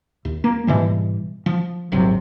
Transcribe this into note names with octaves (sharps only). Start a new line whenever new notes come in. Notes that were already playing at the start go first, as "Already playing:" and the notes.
D#2
A#3
G#2 B2 E3 G3
F3
D#1 G#1 C3 F#3